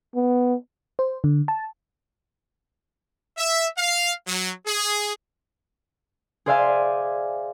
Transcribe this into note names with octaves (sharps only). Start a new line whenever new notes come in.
B3
C5
D3
A5
E5
F5
F#3
G#4
G#4 C5 D5 E5 F5 G#5